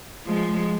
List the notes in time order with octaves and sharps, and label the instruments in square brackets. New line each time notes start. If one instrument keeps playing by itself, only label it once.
[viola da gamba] F3 G#3